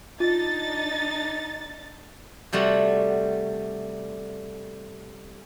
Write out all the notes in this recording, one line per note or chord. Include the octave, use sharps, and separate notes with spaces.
D4 D#4 F4 A6
C3 G3 A3 F#4